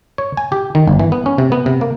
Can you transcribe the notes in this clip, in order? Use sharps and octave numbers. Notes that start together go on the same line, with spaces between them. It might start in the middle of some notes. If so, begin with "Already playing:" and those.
C#5
G#5
G4
D#3
G1
E3
B3
C#4
C3
B3
C3
A#3